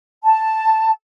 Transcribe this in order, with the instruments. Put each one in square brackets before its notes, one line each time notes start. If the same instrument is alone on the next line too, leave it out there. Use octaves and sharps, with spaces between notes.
[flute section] A5